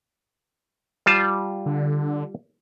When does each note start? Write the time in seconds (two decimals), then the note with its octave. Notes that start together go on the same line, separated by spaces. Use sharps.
1.06 G3 F4 A5
1.66 D3